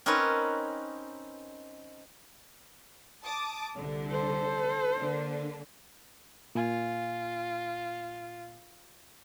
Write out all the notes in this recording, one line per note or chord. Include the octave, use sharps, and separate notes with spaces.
C4 C#4 D#4 A#4 B4 C#5
A5 D6 D#6
C2 D3
A4 C5
D3 A#3 D4
A#2 F4 G#5